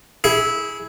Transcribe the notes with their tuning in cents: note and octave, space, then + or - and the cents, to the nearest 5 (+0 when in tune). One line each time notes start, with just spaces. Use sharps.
E4 -15 G#4 +5